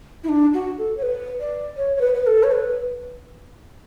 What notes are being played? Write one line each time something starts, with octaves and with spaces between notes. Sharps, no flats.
E4
D4
F#4
A4
C#5
B4
D5
C#5
C#5
B4
B4
A4
C#5
B4